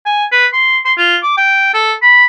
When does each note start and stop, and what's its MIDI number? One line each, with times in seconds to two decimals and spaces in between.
0.06 0.25 80
0.32 0.47 71
0.53 0.78 84
0.85 0.93 84
0.98 1.17 65
1.23 1.34 86
1.37 1.69 79
1.74 1.94 69
2.02 2.25 83